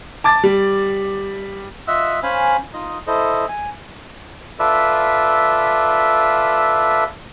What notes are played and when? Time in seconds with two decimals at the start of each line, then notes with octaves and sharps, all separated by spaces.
0.24 A5 D6 A6
0.43 G3
1.87 F4 D#5 E5 F#5 E6
2.23 C#4 C5 F5 G#5 B5
2.74 D#4 F4 D#5
3.07 E4 A4 C5 D#5
3.48 G#5
4.59 F4 A4 B4 D5 E5